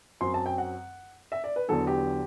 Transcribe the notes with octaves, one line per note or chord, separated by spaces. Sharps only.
F#2 F#3 C4 C6
A5
G5
F#5
E5
D5
B4
E2 D3 F#3 B3 A4
G4